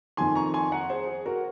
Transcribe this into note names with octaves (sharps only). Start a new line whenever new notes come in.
F2 D#3 G#5 C6
A#5 C#6
G#5 C6
F#5 A#5
G#4 C5
G#4
F#4 A#4